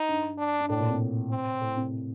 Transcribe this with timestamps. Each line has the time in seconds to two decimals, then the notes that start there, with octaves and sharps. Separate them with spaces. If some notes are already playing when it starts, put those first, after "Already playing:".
Already playing: D#4
0.09 G2
0.38 D4
0.60 G2
0.69 A2 D4
0.80 A#2
0.90 C3
1.30 C4
1.61 A2
1.77 C3